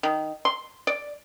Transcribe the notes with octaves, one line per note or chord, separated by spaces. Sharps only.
D#3
C6
D5